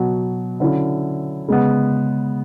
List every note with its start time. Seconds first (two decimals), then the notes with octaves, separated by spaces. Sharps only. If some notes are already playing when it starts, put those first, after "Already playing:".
Already playing: B2 F#3 B3
0.60 D3 F#3 C#4 E4
1.48 C#3 G#3 B3